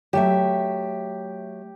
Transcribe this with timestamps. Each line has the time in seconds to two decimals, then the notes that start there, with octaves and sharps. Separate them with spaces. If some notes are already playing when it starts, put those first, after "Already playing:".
0.13 F#3 A3 G4 E5